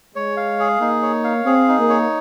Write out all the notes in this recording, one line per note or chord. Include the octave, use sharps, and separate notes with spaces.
G#3 C#5
F5
G#4
A#3 D#4
C#5
F5
C4 G#4
D#4
A#3
C#5